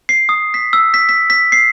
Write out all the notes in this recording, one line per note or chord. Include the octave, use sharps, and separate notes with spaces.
C7
D#6
B6
E6
B6
B6
B6
C7